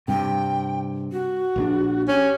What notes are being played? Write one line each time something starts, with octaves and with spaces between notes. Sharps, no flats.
G2 C3 G5
F#4
A#1 D3 D4
C#4 G4